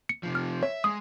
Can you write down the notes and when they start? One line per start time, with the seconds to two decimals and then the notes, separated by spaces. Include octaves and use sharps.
0.09 C#7
0.23 C3 F3
0.35 F6
0.63 C#5 E5
0.84 G#3 D#6